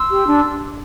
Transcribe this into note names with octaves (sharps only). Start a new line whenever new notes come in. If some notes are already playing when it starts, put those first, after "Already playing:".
Already playing: C6 E6
G4
D4